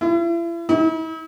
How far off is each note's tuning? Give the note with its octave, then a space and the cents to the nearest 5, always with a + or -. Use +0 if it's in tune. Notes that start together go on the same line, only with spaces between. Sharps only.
E4 +40
E4 -45